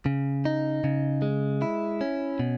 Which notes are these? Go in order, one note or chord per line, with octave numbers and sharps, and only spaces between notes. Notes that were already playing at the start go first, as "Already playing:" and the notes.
C#3
D#4
C#3
G#3
E4
C#4
B2